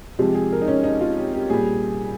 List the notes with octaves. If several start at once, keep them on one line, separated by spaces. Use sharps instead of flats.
C3 F3 G#3 G4
G#4
A#4
D#4
C#4
D#4
F4
G4
G4
A#2 G3 G#4